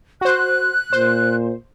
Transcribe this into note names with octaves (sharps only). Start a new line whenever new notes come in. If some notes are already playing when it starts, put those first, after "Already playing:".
F#4 C5 F#6
A#2 C5